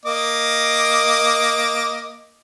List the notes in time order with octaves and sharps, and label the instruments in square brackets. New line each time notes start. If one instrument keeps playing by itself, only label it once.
[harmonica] A#3 D#5 D6